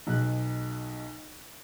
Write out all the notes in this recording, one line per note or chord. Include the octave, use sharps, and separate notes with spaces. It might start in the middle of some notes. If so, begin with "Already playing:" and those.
B1 B2 F#6